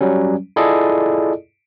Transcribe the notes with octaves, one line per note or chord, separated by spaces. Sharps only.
F#3 G3 C#4
E4 F4 G#4 A4 D5 D#5